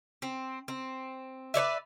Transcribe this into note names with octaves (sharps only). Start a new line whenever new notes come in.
C4
C4
B4 C#5 D5 E5